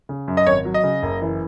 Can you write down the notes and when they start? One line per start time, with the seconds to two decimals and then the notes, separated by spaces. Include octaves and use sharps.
0.09 C#3
0.28 F#2
0.37 D#5
0.46 G#1 C#5
0.65 F#3
0.74 D#5
0.83 C#3
1.03 F#1
1.22 E3